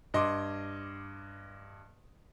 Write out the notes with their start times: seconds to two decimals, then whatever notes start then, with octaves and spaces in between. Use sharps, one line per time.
0.14 G2 D#5 C6 D6